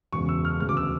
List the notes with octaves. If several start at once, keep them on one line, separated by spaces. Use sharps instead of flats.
E1 E2 C#3 C#6
E6
F6
E1 D2 C#3 F6
D6
E6